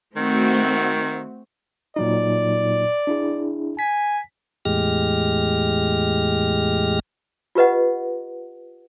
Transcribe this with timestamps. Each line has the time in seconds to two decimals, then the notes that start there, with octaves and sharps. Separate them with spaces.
0.16 D#3 A3 C4 F#4
1.96 A#2 F#3 D#4 D5
3.07 D4 E4 G#4
3.79 G#5 B6
4.65 E2 A2 G#3 G4 F6 A#6
7.55 F4 G4 B4 D#5 F#5